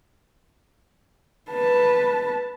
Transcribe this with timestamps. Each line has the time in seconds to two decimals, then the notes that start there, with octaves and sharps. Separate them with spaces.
1.51 B4 A5